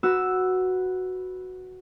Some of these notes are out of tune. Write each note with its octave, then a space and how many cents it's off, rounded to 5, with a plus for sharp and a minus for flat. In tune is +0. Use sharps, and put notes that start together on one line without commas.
F#4 +0 B4 +0 E6 +0